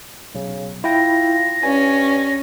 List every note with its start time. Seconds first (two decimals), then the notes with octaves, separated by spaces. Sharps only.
0.35 B1 C#3
0.84 E4 F4 G5 A#6
1.63 G2 C#4 G#5